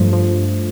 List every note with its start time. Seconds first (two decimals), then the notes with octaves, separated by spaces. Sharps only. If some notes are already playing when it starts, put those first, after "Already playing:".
Already playing: G2 F3 A3
0.13 F3